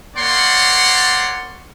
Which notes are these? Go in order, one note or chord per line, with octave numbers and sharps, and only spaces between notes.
A#3 C#5 D5 F#5 C6